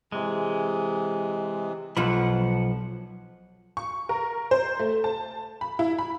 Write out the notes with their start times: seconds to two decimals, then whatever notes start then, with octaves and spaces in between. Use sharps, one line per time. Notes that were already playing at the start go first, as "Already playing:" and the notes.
0.12 C3 E3 G#3
1.97 B1 F3 F#5 B5
3.77 C#6
4.09 A#4
4.51 C5
4.79 A3
5.04 A5
5.61 B5
5.79 E4
5.99 B5